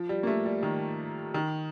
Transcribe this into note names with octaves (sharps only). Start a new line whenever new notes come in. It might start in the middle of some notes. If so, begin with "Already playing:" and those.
Already playing: F3
G3
A#3
A3
G3
D#3
D#3